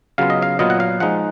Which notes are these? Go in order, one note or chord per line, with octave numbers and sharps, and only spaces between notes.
C#3 F#3 B3 F4 F5
D#5
F5
A#2 F#3 B3 F4 D#5
F#5
F5
F3 G#3 D#4 F#5